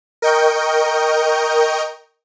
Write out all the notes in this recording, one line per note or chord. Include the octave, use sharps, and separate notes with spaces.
A#4 D#5 G5 C#6 G6